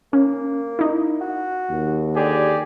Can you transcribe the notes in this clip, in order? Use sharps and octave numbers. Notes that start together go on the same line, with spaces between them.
A#3 C#4
D#4 E4
F#4
D#2
D3 G4 G#4 D5